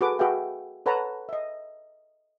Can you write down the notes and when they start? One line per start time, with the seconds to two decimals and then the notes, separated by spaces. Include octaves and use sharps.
0.01 F#4 G#4 A4 B4 D6
0.19 F#4 G#4 B4 E5 F5 G5
0.86 A4 B4 C#5 F#5 A5 A#5
1.29 D#5 E5